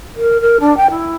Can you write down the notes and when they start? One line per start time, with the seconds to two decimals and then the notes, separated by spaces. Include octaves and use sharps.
0.16 A#4
0.41 A#4
0.60 D4
0.77 G5
0.91 E4